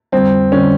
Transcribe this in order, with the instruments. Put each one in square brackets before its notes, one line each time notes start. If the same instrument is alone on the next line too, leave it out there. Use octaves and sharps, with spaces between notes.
[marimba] F2 D3 G3 [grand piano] C4
[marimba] F2 D3 G3 [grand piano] C#4